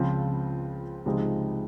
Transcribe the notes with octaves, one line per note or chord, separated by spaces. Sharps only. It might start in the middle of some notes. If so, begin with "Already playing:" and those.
Already playing: C#2 C#3 F3 C4 F4
C#2 C3 F3 G#3 D#4